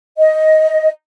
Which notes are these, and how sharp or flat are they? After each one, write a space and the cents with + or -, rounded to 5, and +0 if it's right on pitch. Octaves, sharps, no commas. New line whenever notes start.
D#5 +10